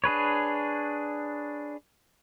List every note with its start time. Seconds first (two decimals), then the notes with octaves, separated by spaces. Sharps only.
0.04 D4 G#4 B4 C#5